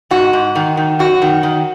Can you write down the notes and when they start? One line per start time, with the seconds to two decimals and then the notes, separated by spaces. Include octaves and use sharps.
0.11 G#2 F#4
0.33 G#2
0.55 D#3
0.77 D#3
0.99 F#2 F#4
1.22 D#3
1.43 D#3